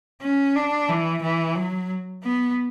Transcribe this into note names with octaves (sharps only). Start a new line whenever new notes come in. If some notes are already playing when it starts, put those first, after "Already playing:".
C#4
D4
E3
E3
F#3
B3